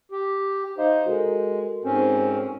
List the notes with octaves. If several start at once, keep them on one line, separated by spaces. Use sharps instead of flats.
G4
D#4 C5 D#5 F5
G#3 F#4 A4 A#4
G#2 C4 C#4